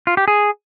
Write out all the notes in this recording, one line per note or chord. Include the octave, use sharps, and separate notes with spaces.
F4
G4
G#4